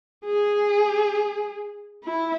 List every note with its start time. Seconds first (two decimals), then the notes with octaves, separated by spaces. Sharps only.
0.25 G#4
2.04 E4